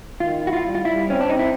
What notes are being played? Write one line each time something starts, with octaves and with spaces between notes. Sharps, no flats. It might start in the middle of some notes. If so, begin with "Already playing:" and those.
D#3 F4
E4
F#4
F4
G3
F4
G3 E4
C4 C#4
D4
C4 D#4
E4